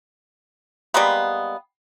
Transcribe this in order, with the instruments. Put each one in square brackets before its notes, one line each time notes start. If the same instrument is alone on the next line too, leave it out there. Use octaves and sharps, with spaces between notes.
[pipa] G3 G#3 A#3 B3